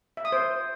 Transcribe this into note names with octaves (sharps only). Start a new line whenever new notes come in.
E5
D#6
C5